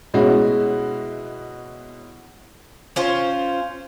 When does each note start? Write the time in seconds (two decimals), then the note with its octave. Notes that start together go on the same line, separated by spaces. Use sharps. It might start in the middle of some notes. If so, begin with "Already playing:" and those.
0.14 B2 G#3 C#4 E4 F#4
2.96 C#4 F4 C5